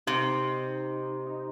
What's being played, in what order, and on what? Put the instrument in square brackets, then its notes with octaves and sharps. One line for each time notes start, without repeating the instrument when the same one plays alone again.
[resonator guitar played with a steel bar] C3 [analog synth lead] D#4
[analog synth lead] D#4